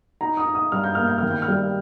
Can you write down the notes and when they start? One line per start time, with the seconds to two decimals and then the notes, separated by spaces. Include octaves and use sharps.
0.21 D#4 A#5
0.37 D#6
0.46 D#4
0.55 D#6
0.72 G2 F6
0.84 G6
0.95 A#3 F6
1.07 G6
1.18 D#3 F6
1.30 G6
1.42 F6
1.48 G3